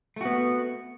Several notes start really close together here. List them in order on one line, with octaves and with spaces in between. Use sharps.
A3 F#4 B3